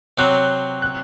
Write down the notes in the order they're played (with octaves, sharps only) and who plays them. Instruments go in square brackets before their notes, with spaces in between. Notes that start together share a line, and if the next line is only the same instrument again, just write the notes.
[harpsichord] C3 F#3 C4 [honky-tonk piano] F#6
[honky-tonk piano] F#6